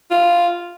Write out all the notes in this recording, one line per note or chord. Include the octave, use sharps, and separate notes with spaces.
F4